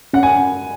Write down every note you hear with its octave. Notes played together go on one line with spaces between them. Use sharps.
C#4 F#5
G#5